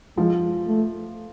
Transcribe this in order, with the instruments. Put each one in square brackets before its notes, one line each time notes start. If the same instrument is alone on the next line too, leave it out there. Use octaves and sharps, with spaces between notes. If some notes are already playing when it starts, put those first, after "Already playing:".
[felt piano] F3 [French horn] G#3
[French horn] A3